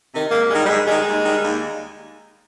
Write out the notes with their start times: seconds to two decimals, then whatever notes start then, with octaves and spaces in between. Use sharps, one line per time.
0.12 C3 D#3
0.31 G#2 A#3
0.50 D#3 G3 G#3
0.64 G3
0.68 G#2 G#3
0.87 D#3 G3 G#3
1.06 D#2
1.25 D#3 G3
1.44 D#2